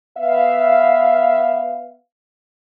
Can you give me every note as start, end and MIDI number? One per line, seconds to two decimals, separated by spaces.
0.18 1.96 59
0.18 1.96 76
0.18 1.96 77